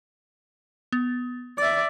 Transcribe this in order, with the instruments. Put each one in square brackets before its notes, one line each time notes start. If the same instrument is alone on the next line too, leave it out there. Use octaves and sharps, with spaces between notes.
[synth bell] B3
[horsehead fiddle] D5 E5 [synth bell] D6